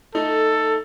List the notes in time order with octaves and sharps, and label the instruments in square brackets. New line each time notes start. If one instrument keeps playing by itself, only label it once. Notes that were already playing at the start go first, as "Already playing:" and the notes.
[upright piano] A3 D#4 [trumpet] A4